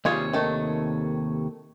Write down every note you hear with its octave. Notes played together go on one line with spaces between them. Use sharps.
D#2 C3 G3 F4 G#4 C#5
D#3 A3